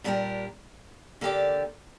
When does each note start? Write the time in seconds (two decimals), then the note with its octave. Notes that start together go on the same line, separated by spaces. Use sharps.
0.04 A#2 G3 D4 G4 A#4
1.21 D3 A#3 G4 D5